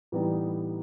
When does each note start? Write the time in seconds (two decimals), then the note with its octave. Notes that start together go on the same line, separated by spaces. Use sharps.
0.12 A2 E3 G3 B3 D#4